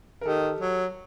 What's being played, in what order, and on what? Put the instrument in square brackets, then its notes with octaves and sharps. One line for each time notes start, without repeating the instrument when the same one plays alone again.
[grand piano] A#4
[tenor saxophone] D#3 [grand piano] G4 A4
[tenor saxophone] F#3